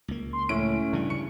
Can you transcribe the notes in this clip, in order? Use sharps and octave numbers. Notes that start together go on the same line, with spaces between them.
C#2 A#3
C6
A2 C#4 E4 D7
G2 C#3 E3
C#6 C#7